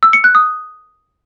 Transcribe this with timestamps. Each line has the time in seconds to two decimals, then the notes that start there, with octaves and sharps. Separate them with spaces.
0.03 E6
0.13 C#7
0.24 F#6
0.35 D#6